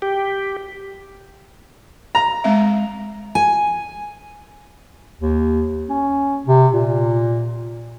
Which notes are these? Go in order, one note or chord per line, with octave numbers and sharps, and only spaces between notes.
G4
A#5
G#3 C4 E5
G#5
D#2
C#4
C3
A#2